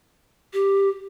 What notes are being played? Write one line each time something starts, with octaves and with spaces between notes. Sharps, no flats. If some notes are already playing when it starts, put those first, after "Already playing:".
G4